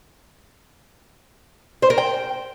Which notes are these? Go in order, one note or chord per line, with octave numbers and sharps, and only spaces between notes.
C5
A#4
G5